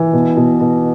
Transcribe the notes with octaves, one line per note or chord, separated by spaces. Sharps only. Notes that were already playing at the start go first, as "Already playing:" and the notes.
Already playing: E3
B2
B2
B2